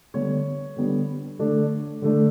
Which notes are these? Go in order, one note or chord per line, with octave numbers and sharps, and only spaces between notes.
D3 G3 B3 D4 C#5
D3 G3 B3 D4
D3 A3 D4
D3 A3 D4